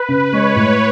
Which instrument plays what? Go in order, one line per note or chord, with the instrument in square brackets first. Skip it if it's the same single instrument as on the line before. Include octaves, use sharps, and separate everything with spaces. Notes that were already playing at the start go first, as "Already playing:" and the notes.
Already playing: [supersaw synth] B4
[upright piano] C#3
[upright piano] G#3 [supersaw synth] C#5
[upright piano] A2